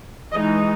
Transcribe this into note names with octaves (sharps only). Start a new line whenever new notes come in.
E3 G#3 D#4 D#5